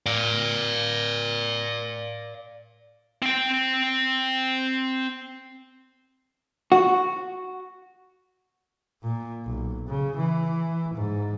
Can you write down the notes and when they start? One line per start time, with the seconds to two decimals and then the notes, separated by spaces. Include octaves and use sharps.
0.06 D5 F5
3.22 C4 G5
6.72 F#4
9.03 A#2
9.46 B1
9.88 C#3
10.17 E3
10.94 G#2